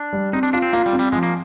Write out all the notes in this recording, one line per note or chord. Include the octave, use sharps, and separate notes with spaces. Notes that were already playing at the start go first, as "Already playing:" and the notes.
Already playing: D4
G3
C4 D#4
D4
D4 F4
C4
A#3 F4
G3
C4
G3
F3 G#3
A#3